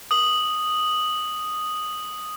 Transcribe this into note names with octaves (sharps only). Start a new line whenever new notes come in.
D#6 F#7